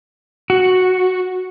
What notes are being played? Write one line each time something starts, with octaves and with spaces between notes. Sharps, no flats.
F#4